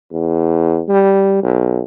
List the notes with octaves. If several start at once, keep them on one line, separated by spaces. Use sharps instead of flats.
E2
G3
B1